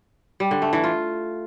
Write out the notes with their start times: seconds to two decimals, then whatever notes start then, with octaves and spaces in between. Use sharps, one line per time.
0.40 G3
0.51 D3
0.62 A3
0.73 E3
0.84 F4